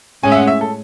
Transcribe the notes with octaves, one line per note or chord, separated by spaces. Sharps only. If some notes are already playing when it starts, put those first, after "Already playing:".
A2 G#3 C#4 G#5
E5
F#5
E5
A4